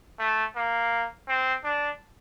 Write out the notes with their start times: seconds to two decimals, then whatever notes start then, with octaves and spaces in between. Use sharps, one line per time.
0.19 A3
0.56 A#3
1.28 C4
1.64 D4